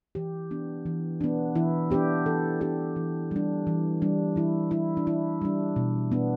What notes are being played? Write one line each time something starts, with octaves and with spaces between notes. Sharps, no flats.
E3 G4
B3 D4
E3
B3 D4
E3 E4
B3 D4 G4
E3 A4
B3 D4 G4
E3
G3 D4
E3
G3 D4
E3 E4
G3 D4 E4
D4
E3 E4
G3 D4
B2
B3 D4